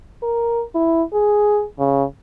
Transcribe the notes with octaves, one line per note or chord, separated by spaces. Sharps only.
A#4
E4
G#4
C#3